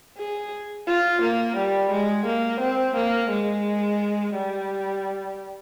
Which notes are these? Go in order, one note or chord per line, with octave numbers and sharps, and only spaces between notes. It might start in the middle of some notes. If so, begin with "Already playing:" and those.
G#4
F4
A#3
G3
G#3
A#3
C4
A#3
G#3
G3